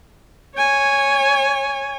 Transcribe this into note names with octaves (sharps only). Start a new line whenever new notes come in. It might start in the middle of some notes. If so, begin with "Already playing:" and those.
C#5 G#5